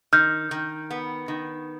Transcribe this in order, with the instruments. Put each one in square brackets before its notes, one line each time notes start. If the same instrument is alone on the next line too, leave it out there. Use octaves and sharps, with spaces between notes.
[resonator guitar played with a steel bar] D#3 [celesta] F6 G6
[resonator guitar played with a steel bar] D#3
B3
D#3